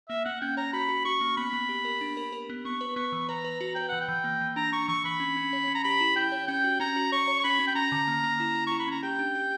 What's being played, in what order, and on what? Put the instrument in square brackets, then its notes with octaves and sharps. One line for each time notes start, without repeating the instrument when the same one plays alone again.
[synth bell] A#3 [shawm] E5
[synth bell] A#3 [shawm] F#5
[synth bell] C#4 [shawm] G5
[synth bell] C#5 [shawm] A#5
[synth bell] F#4 [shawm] B5
[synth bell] F#4
[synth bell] F#4 [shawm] C#6
[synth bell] A#3
[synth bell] B3 [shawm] B5
[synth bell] B3
G4
A#4
D4
A#4
A#4
B3
[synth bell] B3 [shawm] C#6
[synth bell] B4
[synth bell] B3 [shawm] C#6
[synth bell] E3
[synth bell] B4 [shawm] A#5
[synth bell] B4
[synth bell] F#4 [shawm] A#5
[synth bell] B4 [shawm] G5
[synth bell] E3 [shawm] F#5
[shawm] G5
[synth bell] E3
A#3
E3
[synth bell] D4 [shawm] A#5
[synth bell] D4 [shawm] C#6
[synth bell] E3 [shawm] C#6
[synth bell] E3 [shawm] B5
[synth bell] C#4
C#4
C#5
C#4
[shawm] A#5
[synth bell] G4 [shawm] B5
[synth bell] E4
[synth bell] E4 [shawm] G5
[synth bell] C#5
[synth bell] C#4 [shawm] G5
[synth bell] F#4
[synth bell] C#4 [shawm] A#5
[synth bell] F#4
[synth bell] C#5 [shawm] C#6
[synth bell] C#5
[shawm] C#6
[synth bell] C#4 [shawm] B5
[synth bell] C#4
[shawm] G5
[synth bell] C#4 [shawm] A#5
[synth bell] D3
A#3
A#3
E4
E4
[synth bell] E4 [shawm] C#6
[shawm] B5
[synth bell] C#4 [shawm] A#5
[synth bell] G4 [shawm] G5
[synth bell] D4
G4